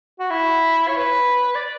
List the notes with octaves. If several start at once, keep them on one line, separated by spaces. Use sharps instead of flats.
F#4
E4
C#5
B4
D5